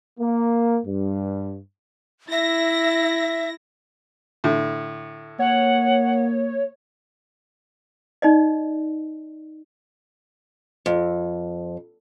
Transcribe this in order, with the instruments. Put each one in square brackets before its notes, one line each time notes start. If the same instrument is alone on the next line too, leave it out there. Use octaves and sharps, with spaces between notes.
[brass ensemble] A#3
G2
[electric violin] E4 [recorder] E5 [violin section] A#6
[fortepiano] A2 D3
[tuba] A#3 [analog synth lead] C#5 [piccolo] F#5
[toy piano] D#4 D5 D#5
[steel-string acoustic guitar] F2